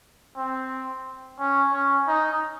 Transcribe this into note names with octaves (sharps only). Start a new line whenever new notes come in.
C4
C#4
C#4
D#4